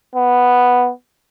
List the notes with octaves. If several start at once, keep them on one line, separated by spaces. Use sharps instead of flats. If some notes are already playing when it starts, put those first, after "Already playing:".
B3